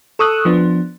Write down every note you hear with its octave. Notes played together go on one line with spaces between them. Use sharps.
A4 C#6 D#6 E6 F#6
F3 B3 D4